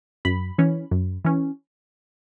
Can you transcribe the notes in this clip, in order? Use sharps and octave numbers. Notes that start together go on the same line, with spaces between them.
F#2 B5
E3 C#4
F#2
E3 C#4